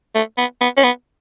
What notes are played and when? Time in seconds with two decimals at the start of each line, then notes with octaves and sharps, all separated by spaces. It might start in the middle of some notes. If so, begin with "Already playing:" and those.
0.15 A3
0.38 B3
0.61 B3
0.77 C#4
0.84 B3